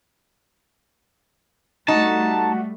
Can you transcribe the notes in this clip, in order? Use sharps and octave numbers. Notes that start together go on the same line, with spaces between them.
G3 A3 D#4 F#4 A5